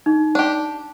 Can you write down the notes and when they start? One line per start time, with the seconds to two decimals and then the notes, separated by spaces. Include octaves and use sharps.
0.06 D#4
0.35 D4 G4